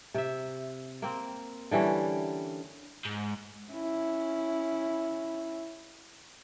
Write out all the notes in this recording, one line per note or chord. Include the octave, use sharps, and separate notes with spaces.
C3 E5
A#3 C4
D3 E3 G3 C#4
G#2
C#4 E4